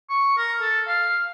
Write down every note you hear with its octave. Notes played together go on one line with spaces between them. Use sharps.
C#6
A#4
A4
F5